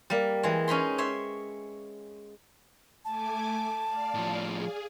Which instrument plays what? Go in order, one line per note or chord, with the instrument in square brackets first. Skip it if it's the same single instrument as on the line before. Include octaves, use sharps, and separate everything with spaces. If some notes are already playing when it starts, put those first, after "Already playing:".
[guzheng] G3 A#3
E3 G#3
C#4 D#4 B5 C6
C#5 E5 C6
[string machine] A3 G#5 D6 [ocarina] A5
[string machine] D5 F5
[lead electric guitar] A2 F3
[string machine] G#4